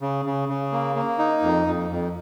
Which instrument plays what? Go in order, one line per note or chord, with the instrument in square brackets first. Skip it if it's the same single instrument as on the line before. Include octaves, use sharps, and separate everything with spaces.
[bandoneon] C#3
C#3
C#3
A#3
A#3
D#4
F2
F2
F2